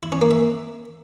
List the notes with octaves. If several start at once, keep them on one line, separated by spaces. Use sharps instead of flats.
E4
C#4
A#3
E5